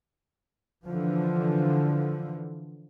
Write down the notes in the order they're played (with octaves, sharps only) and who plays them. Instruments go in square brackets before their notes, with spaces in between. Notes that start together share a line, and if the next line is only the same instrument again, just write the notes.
[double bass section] D3 E3 F3